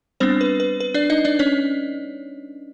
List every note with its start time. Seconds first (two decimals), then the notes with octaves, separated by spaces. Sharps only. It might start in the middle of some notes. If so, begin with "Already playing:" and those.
0.20 G3 B3 C4 D4 C5
0.41 B4
0.60 B4
0.80 B4
0.94 D4 D5
1.10 D#4 D#5
1.25 D4 D5
1.39 C#4 C#5